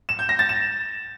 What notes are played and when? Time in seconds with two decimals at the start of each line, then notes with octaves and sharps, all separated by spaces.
0.09 E7
0.19 G6
0.29 A#6
0.39 A6
0.49 E7